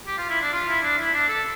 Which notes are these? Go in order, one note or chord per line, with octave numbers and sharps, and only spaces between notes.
G4
F4
E4
D4
F4
E4
D4
E4
D4
A4